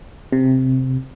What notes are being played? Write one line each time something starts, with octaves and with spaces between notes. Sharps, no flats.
C3